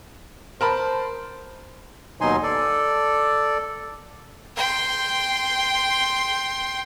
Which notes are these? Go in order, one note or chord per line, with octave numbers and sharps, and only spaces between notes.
A#4 C5 A5 B5
D#2 B2 F#3 D#4 G#5 C6
A4 D5
G5 C6